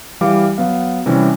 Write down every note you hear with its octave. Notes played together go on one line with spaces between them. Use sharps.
E3 G3 F5 D6
F#3 B3 F5
C3 E3 G3 C#4